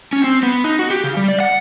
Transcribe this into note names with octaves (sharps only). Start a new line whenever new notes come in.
C#4
C4
B3
D#4
F#4
G4
C#3
G3
D5
F#5